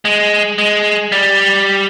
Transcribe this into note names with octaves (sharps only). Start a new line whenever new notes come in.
G#3
G#3
G3